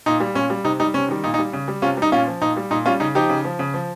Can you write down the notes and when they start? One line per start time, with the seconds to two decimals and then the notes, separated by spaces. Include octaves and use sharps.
0.06 A#2 D#4
0.20 G3
0.35 A#2 C#4
0.50 G3
0.64 C3 D#4
0.80 G3 D#4
0.94 C3 C#4
1.08 D#3 G3
1.24 A#2 D#4
1.34 D#4
1.39 G3
1.53 C#3
1.68 G3
1.82 C3 C#4 F4
1.97 G3 D#4
2.12 A#2 C#4 F4
2.27 F3
2.41 A#2 D#4
2.56 G3
2.71 A#2 D#4
2.86 G3 C#4 F4
3.00 C#3 D#4
3.15 F3 D#4 G4
3.29 C#3
3.45 F3
3.59 C#3
3.74 F3